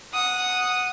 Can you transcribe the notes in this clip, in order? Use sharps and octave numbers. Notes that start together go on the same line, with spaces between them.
F#5 D#6